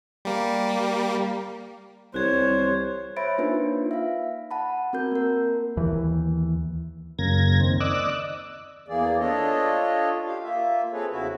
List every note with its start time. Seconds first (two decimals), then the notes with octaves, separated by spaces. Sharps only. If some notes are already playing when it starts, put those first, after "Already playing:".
0.25 G3 A#3
2.14 C2 C5 C#5 F#6 G#6 C7
3.17 C5 C#5 E5 B5 A6 D7
3.38 A#3 D4 D#4 F4 B4
3.91 E5 F5
4.51 F#5 A5 B5
4.93 C4 F#4 A#4 G6
5.12 A#3 A#4
5.77 D#2 E3
7.19 F#2 C#3 A#3 G#6 A#6
7.60 D#3 C4
7.80 D5 D#5 D6 E6 F#6
8.88 E2 E3 A#3 G#4 D5
9.19 D4 F4 A4 C#5 D#5
10.26 G4 F5
10.43 A#3 F4 E5
10.92 C4 G#4 A4 B4 C#5
11.11 E2 C#3 E4 F#4 E5